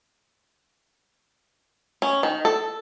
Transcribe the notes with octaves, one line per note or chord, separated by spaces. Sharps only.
C#4
D#3
A4